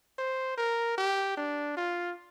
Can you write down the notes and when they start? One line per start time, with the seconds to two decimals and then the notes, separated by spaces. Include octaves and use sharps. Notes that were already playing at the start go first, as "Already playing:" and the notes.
0.19 C5
0.58 A#4
0.98 G4
1.37 D4
1.77 F4